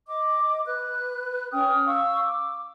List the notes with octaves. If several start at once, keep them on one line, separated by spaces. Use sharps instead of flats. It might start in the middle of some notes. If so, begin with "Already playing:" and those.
D#5 D6
B4 F#6
C#4 G5 D#6 F6
F5 C#6 E6
D6